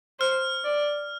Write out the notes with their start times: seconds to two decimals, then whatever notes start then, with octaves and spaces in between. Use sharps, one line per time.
0.19 C5 F6
0.64 D5